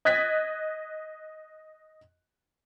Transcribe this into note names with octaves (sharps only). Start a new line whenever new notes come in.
D#5 F#6 G#6 A6 B6